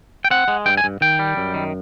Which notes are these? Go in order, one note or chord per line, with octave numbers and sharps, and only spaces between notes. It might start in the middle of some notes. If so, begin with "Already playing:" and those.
G5
C4 F#5
G#3
G2 G5
G#5
G2
D#3 G5
G3
F#2
D#3